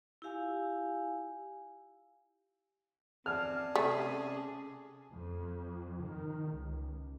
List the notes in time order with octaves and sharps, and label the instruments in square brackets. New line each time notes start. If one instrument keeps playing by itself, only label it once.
[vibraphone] E4 F4 G4 F5 G#5
[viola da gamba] C4 [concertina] D5 G#5 A5 [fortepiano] F6
[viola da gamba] C3 C#4 G#4 [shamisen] A3
[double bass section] F2
D#3
C#2